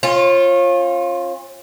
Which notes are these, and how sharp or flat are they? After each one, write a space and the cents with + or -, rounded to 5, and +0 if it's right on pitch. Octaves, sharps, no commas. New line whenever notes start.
C#4 -40 F4 +0